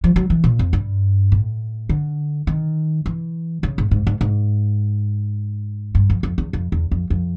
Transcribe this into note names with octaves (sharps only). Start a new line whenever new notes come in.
F3
F#3
E3
A#2
F2
G2
A2
D3
D#3
E3
C#3
G#2
G#2
G#2
G#2
G2
F2
F2
E2
F2
E2
F2
F2